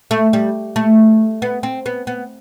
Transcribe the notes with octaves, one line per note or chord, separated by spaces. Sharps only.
A3
G3
A3
B3
C4
B3
B3